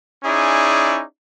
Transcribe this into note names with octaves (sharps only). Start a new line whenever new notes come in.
C#4 D#4 E4 G#4 D5